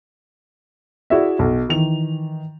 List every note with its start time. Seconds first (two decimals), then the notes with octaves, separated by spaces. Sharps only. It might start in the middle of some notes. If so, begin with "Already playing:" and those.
1.10 E4 F#4 G#4 D5 E5
1.39 B1
1.69 D#3 E3 F7